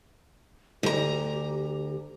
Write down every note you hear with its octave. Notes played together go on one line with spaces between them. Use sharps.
D2 G4 A#5